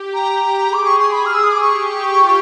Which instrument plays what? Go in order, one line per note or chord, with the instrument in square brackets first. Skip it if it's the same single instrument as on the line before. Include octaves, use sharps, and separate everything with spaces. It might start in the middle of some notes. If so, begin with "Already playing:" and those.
Already playing: [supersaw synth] G4
[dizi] A#5
[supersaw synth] G#4
[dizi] D6
C#6
C6
B5
F6
E6
D#6
D6
[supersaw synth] G4 [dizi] C#6
[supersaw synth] F4